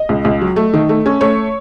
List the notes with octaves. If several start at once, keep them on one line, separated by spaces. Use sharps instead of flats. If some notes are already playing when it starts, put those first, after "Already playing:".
Already playing: D#5
C#2
C#2
F#3
A3
D#3
A3
C#4
A3 C#5